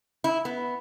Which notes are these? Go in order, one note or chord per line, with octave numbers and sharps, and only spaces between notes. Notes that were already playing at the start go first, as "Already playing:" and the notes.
E4
B3